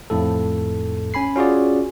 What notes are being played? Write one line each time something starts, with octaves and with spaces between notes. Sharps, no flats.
F2 A2 A4
C#4 G#5 B5 C7
C#4 F4 F#4 G#4 D5